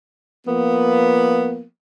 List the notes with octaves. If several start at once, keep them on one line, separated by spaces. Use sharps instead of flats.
F3 A#3 B3